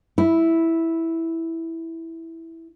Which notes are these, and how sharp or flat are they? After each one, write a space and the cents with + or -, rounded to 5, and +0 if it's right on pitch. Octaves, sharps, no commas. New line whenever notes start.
E4 -5